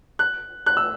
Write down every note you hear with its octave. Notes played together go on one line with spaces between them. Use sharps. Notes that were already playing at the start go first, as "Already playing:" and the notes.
F#6
F#6
E6